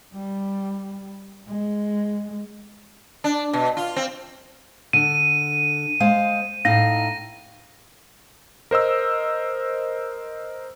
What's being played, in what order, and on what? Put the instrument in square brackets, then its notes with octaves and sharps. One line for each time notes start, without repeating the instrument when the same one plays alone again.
[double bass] G3
G#3
[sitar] D4
B2
F4
C4
[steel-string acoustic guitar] D3 [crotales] D#7
[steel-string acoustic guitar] G#3 C5 F5
[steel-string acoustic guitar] A2 D#4 F5 [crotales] A#6
[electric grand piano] A#4 C5 D#5 E6